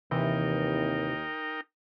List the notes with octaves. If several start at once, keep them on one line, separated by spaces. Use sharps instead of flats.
D#2 C3 E3 D#4 E4 A#4 G5